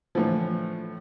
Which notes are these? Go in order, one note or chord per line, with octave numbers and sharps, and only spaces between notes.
A2 D3 E3 F3